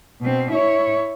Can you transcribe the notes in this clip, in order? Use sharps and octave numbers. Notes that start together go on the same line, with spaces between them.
B2 C4
E4 C#5